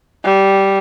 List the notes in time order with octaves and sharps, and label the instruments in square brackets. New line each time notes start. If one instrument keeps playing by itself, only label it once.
[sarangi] G3